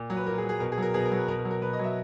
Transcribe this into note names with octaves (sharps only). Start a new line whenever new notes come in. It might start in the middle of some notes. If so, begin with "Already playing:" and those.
Already playing: A#2
F#3
B4
A#2 A#4
G#4
F#3
G#4
B2 A#4
G#4
F#3 A#4
B2 G#4
A#4
F#3
B4
B2 A#4
A#4
F#3
A#4
B2 B4
D#5
F#3 E5